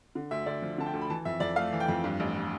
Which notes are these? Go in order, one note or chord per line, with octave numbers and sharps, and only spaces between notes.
D3
D2 E5
D2 D5
F3
D3 A5
G5
D2
B5
E3 A5
F2 E5
F2 D5
A3 F5
E3
G5
F2
G2
A1